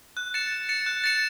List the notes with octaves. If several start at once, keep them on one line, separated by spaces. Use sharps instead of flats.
F#6
A6 C#7 E7
F#6
A6 C#7 E7
F#6
A6 C#7 E7